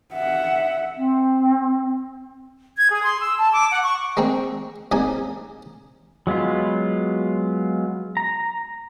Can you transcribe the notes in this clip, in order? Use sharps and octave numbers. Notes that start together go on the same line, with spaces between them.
E5 F#5
C4
G#6
G#4
C6
E6
A5
D6
F#5
C#6
G#3 A#3 C4 G5
C2 C#3 A#3 D#4 G#5
F#3 G#3 B3 F4
A#5